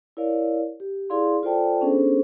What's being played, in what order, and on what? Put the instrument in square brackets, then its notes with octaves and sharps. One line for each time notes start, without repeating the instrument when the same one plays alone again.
[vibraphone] E4 A#4 C#5 D5 F5
G4
E4 G#4 D5 F5 C6
F4 A4 C5 D5 G5 A5
B3 C#4 D4 G#4 A4 C5